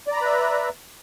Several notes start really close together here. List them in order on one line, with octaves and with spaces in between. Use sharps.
D5 A#5 B5 B4 E5